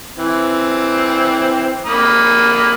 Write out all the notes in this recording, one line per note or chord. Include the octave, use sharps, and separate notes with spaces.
E3 C4
A#3 B5 D#6